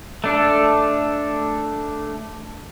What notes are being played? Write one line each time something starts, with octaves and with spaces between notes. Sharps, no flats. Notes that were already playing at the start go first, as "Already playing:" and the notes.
A3 D4 A4